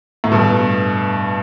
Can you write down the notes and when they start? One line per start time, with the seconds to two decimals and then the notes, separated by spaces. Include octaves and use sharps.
0.24 A2
0.32 G2 B2